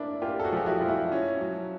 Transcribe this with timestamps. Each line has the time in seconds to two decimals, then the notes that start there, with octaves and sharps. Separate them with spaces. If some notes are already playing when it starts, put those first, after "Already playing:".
Already playing: A#3 D4 E4
0.22 A#3 F4 G4
0.40 A4
0.44 F#4 G#4
0.52 F3 G4
0.66 E4 F#4
0.81 F3 F4
0.88 E4 F#4
1.12 C#4
1.41 F#3